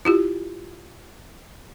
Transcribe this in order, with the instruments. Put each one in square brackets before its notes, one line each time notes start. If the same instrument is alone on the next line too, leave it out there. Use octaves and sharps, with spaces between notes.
[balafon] E4 F4 G4